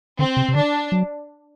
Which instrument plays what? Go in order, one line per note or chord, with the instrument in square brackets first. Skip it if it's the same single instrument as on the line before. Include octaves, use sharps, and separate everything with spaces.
[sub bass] D3 [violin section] C4
[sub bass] C3
C3
[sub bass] D3 [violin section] D4
[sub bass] F#3